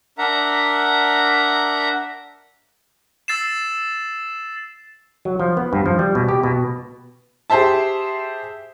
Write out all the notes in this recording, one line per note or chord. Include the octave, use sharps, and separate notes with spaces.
D4 A#4 E5 F#5 A#5
E6 A6 C7 E7
F#3
F3
B3
G2
F3
G3
B2
G4
B2
G4 G#4 C5 E5 A5